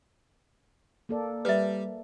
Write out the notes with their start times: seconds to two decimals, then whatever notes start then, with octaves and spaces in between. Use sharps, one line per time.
1.09 A#3 A4 D5
1.45 G3 B4 E5